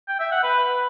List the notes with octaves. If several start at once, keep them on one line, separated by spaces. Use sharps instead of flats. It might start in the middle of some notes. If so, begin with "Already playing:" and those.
G5
E5
F#5
B4